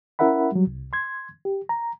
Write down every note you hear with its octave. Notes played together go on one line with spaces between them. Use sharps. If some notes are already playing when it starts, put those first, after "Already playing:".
C#4 E4 A#4 E5 F#5 B5
F#3 G3
C2
C6 G#6
G4
A#5